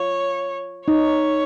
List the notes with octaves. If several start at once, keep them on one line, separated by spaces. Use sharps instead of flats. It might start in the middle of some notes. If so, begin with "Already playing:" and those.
Already playing: F4 C#5
D#4 C#5